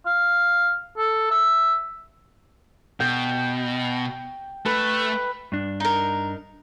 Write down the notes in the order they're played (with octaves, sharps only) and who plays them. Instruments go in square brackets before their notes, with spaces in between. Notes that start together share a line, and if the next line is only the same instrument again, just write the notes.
[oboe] F5
A4
E5
[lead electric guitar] B2 [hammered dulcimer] G5
[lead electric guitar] A3 [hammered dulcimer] B4
[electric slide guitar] G2 D4
[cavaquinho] D#4 A#4